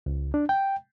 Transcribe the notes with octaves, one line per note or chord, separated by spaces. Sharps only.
C#2
D4
G5